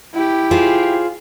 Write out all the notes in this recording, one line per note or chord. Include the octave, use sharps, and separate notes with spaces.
E4 G4
F4 G#4 C5